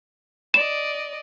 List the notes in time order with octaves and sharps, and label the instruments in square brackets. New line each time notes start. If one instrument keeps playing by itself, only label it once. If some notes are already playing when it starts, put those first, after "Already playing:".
[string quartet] D5 D#5 [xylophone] E7